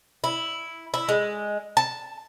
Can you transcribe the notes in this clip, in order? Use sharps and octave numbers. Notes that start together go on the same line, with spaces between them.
E4
E4
G#3
A5